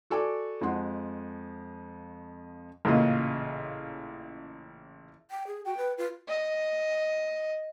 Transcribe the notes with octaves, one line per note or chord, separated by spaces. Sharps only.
F#4 A4 D5 G#5 D6
F2 F3 G#3 F#5 C6
A1 A#2 C#3 F4 D#5
G5
G#4
F#4 G5
B4
F4 B4
D#5